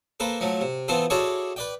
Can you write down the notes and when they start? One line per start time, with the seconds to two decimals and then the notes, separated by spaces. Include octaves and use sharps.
0.20 A#3 A4 B4 C5
0.40 F3 F#3 A3
0.61 C3
0.88 E3 B3 C4 F4 A4 C5
1.10 E4 F#4 G#4 A4 C#5 D5
1.56 B4 D5 G5